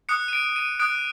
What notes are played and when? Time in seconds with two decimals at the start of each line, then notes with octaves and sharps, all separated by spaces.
0.09 D#6 F#6 C#7
0.28 D#7
0.33 D7
0.56 D#7
0.79 D#6 F#6 D7